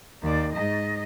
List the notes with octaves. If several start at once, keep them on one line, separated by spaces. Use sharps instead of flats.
D#2 D5
G#2 D#5